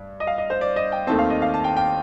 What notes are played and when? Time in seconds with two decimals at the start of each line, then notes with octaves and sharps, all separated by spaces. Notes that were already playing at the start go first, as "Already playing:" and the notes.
Already playing: G2
0.20 D#5
0.27 F5
0.38 D#5
0.50 C5
0.61 D5
0.76 D#5
0.92 G5
1.07 D#2 D#3 A3 C4 A5
1.19 F5
1.30 D#5
1.42 F5
1.54 A5
1.64 G5
1.77 G5